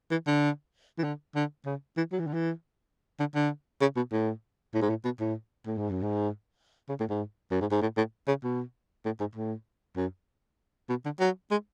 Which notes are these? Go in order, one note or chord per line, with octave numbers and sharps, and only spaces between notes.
E3
D3
E3
D3
D3
C#3
E3
F#3
E3
D3
E3
D3
D3
C#3
B2
A2
A2
G#2
A2
B2
A2
A2
G#2
F#2
G#2
C#3
A2
G#2
F#2
G#2
G#2
A2
A2
C#3
B2
A2
G#2
A2
F#2
B2
D3
F#3
G#3